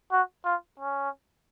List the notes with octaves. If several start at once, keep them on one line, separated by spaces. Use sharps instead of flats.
F#4
F4
C#4